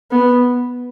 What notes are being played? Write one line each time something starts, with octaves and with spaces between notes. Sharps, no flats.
B3